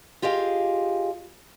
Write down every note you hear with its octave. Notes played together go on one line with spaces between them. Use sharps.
F4 G4 G#4 D#5 F5